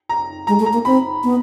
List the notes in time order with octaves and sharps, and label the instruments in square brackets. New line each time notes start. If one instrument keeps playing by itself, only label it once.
[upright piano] A#5
[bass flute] G#3 [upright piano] A#5
[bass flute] A3
[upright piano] A#5
[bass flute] A#3
[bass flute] C4 [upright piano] B5
[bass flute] B3